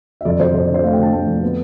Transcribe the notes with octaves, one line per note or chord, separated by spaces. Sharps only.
E5
F2 D5
F2 C5
F2 C5
D5
D3
C5
A3 F5
G5
D3 A5
A3 A5
F2
B3